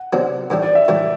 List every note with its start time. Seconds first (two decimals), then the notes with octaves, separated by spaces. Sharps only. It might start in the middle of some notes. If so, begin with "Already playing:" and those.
Already playing: F#5
0.13 C3 F#3 B3 D4
0.50 A2 E3 G3 D4
0.62 D5
0.75 E5
0.88 A2 E3 G3 D4